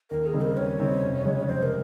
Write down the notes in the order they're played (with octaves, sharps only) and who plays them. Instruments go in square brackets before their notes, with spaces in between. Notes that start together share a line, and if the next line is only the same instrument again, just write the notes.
[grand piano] D#2 [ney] A#4
[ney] G#4
[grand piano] C#3 G3 C4 D#4
[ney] A#4
[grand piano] D#2 [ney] C#5
[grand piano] C#3 G3 C4 D#4
F1
F2 C#3 G#3
[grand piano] F1 [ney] C5
[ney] A#4